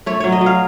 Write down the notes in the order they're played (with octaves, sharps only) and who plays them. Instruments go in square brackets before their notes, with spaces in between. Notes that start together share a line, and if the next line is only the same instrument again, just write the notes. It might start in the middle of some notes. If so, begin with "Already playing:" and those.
[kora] A3 C#5
F#3 C#5
D#5
F#3
F5